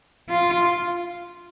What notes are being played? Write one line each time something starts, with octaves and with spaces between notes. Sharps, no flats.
F4